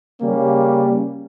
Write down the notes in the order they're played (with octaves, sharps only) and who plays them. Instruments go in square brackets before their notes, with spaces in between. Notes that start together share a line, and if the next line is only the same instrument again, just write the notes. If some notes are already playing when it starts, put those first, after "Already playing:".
[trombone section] C#3 G3 A#3 C#4